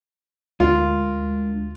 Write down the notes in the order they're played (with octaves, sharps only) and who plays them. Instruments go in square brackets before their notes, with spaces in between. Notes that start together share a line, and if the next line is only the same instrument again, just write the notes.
[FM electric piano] D2 [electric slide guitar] G#3 D4 A#4 [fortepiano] F4